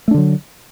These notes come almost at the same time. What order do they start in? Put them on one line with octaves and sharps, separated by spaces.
A3 D4 D3 F#3